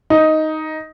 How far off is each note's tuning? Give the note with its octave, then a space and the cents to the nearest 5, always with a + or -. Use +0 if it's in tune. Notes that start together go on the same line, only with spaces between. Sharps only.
D#4 +5